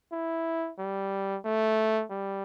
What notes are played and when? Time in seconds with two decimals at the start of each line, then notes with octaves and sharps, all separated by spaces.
0.12 E4
0.78 G3
1.45 A3
2.11 G3